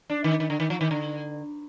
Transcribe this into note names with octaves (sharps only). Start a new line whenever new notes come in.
D4
D#3
D#3
D3
D#3
F3
D#3
D3